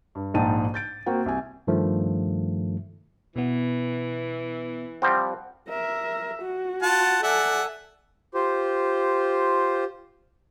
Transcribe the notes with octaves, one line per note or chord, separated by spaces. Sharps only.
G2
A#1 G#2 D#4 G5 A5 D#7
G6 A6 D7
A#3 C4 F#4 G5
C2 G#5
G2 D#3 F3 A3
B2 E3 B3
F3 G3 C4 F#5
A#4 E5
F#4
F4 F#5 A5
A4 D5 E5 F#5 G#5
F4 G4 C5